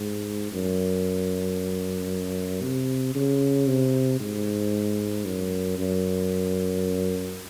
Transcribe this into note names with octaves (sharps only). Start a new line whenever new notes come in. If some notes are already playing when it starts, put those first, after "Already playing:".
Already playing: G#2
F#2
C3
C#3
C3
G#2
F#2
F#2